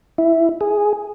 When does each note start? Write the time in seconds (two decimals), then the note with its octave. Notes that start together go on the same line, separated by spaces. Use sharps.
0.18 E4
0.61 G#4